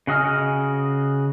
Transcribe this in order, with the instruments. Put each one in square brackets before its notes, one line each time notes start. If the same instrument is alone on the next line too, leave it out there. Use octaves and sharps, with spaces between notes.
[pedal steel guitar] C#3 F#4 D#5 G#5 F6